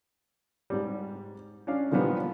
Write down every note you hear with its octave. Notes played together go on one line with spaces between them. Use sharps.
G#2 G3
C#4 D4 F5
A#2 D3 D#3 F3 G3 B3